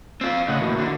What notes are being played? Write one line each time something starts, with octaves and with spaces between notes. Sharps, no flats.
C4 F4
A2 C#3 D#5 F#5
E3 A#3 F#4
D3